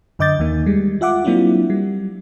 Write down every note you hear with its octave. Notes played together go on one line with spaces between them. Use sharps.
F#2 D3 D#5 D6 G6 A6
D#2 D#3 A#3
G3 G#3
F4 E5 F#5 D6
F#3 A#3 C4 D4 E4 F4
G3